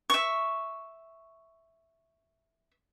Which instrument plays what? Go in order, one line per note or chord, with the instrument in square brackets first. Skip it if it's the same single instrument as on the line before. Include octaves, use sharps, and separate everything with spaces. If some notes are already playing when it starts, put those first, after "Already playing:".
[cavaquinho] E5 C#6